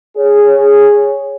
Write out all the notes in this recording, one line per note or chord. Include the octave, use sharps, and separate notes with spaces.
G#4 C#5